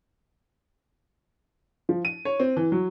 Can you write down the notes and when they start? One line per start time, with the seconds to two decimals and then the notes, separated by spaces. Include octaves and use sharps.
1.89 F3
2.05 D#7
2.25 C#5
2.40 C4
2.57 E3
2.72 F#3